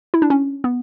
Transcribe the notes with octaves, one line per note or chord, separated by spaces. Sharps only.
E4
D4
C#4
B3